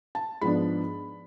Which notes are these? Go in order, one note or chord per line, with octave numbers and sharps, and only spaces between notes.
A5
G#2 F3 B3 D4 B5